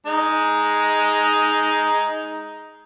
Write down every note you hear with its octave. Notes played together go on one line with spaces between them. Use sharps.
G#3 D#4